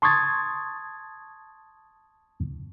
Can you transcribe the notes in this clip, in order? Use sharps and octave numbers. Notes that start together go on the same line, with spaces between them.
A5 C6 C#6 D#6 G#6 A6